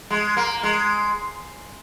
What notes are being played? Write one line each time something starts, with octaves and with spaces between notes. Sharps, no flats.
G#3
A#3
G#3